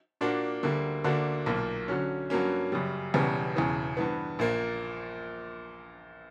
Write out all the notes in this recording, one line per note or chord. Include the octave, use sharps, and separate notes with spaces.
A#2 A#3 D4 F#4
D2 D3 G3 A#3
D2 D3 A#3 D4 F#4
B1 A#2 A#3
D3 F#3 C#4
G2 F#3 A#3 C#4
F#2 C#3 G3
E1 E2 C#3 G3 B3
E1 E2 C#3 E3
G2 E3 B3
A#1 A#2 A#3